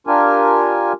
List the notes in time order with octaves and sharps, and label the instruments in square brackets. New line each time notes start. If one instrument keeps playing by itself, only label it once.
[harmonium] D4 F4 G4 A#4 G#5